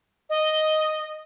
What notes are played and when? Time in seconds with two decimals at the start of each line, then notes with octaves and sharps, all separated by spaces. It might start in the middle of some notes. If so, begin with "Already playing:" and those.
0.30 D#5